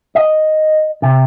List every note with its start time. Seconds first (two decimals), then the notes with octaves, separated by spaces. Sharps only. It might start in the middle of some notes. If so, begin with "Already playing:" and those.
0.15 D#5
1.02 C3